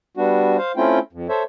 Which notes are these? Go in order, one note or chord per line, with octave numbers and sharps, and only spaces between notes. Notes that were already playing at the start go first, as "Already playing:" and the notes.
G3 B3 D4 F#4
C5 F5
A3 C4 C#4 E4 F4 G5
F2
A4 C5 C#5 E5